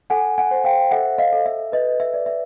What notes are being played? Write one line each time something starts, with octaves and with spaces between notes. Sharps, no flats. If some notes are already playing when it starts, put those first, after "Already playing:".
A4 F#5 G#5
F#5 G#5
C5
F5 G5
A4 E5 F#5
D#5 F5
A4
E5
B4 D#5
E5
D5
E5